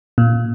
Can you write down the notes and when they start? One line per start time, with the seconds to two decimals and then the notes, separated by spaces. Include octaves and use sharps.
0.18 A#2